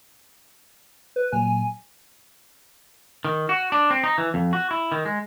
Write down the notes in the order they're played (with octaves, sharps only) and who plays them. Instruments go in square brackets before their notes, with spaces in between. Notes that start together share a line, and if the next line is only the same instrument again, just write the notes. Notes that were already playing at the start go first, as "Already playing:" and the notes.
[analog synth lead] B4
[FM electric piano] A#2 F#3 [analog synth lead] G#5
[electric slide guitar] D#3
F#4
D4
C4
D#4
E3
F2
F#4
E4
D#3
G#3